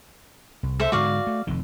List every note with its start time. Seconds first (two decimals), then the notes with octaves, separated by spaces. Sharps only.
0.63 C2
0.80 A4 C5 E5
0.92 G#2 D3 G#3 F#4 D5 F5
1.27 A3
1.47 F1 F2 D#3